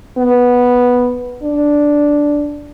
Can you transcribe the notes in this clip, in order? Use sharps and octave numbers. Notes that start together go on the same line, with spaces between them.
B3
D4